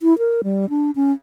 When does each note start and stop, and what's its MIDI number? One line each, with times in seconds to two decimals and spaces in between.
0.01 0.17 64
0.18 0.41 70
0.44 0.69 55
0.69 0.91 62
0.96 1.12 61